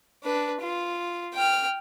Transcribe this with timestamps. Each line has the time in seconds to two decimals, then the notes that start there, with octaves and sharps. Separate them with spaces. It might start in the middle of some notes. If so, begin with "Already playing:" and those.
0.23 D4 B4
0.60 F4
1.34 G5 F6